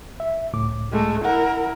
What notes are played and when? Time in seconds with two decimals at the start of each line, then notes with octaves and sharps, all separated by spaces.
0.20 E5
0.53 C#2 A2 D6
0.92 G#3 A3
1.25 E4 A#4 F#5